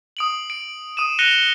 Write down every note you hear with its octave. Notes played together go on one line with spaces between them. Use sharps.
D#6 D7 F#7
D7
D#6 D#7 E7
F#6 A#6 C#7 D#7 F7 G7